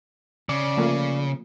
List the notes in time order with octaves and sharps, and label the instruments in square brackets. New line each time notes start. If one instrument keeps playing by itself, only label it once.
[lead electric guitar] C#3 [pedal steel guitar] D5
[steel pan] F3 A3 A#3